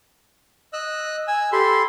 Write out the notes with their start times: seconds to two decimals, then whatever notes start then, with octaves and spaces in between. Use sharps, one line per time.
0.73 D#5 E6 F#6
1.27 G#5 E6
1.52 G4 A4 B5 C6